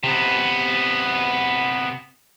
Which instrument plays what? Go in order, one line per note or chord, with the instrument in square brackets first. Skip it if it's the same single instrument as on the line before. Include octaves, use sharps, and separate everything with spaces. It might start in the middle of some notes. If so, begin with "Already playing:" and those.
[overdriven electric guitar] C3 B3